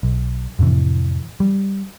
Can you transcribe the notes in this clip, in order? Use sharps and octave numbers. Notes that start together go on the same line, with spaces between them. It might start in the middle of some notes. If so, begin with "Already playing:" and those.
B1
F2 A2 C3 E3
G3